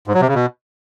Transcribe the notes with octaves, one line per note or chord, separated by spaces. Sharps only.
G#2
F#3
C3
C#3
B2